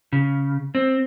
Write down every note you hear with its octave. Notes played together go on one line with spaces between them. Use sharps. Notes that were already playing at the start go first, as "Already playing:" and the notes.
C#3
C4